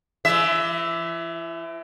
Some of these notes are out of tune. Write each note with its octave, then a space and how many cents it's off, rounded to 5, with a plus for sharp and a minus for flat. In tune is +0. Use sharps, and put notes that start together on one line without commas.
E3 +40 E5 +0